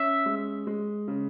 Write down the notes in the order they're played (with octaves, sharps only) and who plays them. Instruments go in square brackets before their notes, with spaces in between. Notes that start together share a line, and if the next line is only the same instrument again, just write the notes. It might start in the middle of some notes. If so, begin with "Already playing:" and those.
Already playing: [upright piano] C#4 [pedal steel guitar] E5
[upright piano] G#3
G#3
C#3